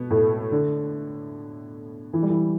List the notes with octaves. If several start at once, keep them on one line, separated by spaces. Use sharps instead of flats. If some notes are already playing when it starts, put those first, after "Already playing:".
Already playing: B2 B3
A2 A3
D3
E3
G3
E3